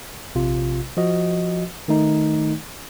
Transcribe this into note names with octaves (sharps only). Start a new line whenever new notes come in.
A#1 C3 F4
F3 F#4 D#5
D#3 A3 D#4